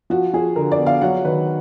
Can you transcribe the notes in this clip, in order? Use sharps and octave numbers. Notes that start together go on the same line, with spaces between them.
F3 F#4
F3 G#4
D3 A#4
D5
B3
F5
F#3 F#5
D#3 B4